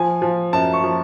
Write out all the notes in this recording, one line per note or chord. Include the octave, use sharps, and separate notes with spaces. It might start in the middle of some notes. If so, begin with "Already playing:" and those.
Already playing: F3 G#5
F3
F#2 A5
C#6
F3